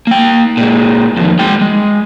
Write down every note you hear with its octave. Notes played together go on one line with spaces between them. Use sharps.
A#3 G5
A#2 G#3
F2 D#3
G#3 G5
G#3